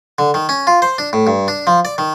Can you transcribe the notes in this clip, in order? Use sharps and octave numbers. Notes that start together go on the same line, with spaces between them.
D3
D#3
C#4
F4
C5
D4
A2
G2
D4
F3
D5
D#3